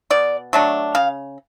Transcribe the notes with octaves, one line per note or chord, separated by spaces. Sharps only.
B2 D5
F#3 A3 D4
C#3 F5